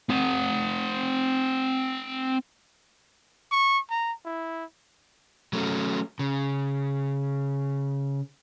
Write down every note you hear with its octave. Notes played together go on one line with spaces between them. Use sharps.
C4 F#5
C#6
A#5
E4
F#3 A3 C#4
C#3